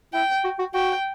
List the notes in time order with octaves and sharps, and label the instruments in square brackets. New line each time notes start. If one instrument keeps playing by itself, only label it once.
[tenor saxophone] E4 [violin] G5
[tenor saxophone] F#4
F#4
[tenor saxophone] F#4 [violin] G5